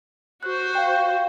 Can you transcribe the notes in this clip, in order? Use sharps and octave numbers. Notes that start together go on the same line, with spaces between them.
F#4 C5 F#6
F5 G5